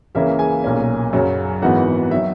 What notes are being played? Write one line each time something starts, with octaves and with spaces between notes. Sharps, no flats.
C#2 C#3 E3 A#3 C#4 E4 E5
G#4 G#5
B1 A#2 A#3 C#4
F#2 C#3 F#3 C#4
G#1 G#2 E3 B3 F#4 F#5
D#3 F#3 E5